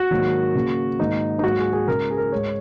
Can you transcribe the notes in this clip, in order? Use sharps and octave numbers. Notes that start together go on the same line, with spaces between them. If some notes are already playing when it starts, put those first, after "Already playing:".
Already playing: F#4
G#2 D#3 F#3 A#3
C#3 A#3
G#2 D#3 A#3 D#4
D#4
G#2 F#3 A#3 F#4
G#4
G#4
C#3 G#3 A#4
G#4
A#4
G#2 G#3 C#5